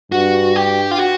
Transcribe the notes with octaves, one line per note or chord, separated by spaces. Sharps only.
G2 F#4
G4
F4
F#4